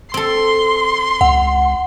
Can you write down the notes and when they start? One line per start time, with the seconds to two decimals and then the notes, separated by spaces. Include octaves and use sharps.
0.14 C4 A4 C6
1.21 C#2 F#5